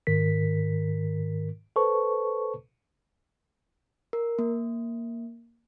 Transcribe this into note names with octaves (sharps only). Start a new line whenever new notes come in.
G#2 D#3 A#4 B6
A4 B4 C5 A5 C#6
A#4
A#3